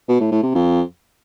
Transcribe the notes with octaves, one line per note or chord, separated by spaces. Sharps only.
B2
A2
A2
C3
F2